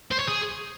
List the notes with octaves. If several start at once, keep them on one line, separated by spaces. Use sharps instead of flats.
C5
C#5
G#4